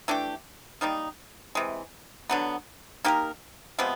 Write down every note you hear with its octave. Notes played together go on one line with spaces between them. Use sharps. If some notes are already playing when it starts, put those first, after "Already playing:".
E3 A3 D4 G4
D#3 G3 A#3 D#4
C3 E3 G#3
D3 F#3 B3
A#3 D#4 G4 A#4
C3 F3 G#3 B3